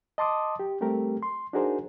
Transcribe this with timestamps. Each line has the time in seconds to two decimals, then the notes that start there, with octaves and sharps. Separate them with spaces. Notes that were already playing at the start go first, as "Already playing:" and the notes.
0.18 D#5 A5 C6 D6 D#6
0.59 G4
0.81 G3 A3 C4 G4 A#4
1.22 C6
1.53 D4 D#4 F#4 G#4 A#4 C5